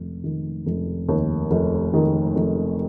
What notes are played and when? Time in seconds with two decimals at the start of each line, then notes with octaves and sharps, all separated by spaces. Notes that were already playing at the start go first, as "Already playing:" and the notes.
Already playing: F1
0.24 D#3
0.66 F1
1.09 D#2
1.51 F1
1.94 D#3
2.36 F1